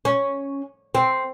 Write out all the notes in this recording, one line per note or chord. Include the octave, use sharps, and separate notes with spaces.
C#4
C4